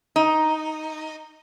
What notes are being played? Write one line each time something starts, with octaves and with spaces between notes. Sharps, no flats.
D#4